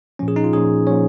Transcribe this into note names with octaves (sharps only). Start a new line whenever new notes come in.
A#2 F3 C#4
G#4
D#4
F4
A#2 F3 C#4 G#4
A#2 F3 C#4 C#5